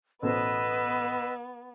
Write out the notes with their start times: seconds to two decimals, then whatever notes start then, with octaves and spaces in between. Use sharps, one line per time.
0.22 A1 B2 B3 B4 C5 D#5 E6